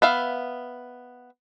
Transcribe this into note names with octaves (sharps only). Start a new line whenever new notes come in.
B3 E5 F5